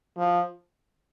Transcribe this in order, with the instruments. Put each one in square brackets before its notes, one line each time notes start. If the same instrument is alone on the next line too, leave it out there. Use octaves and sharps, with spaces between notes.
[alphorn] F3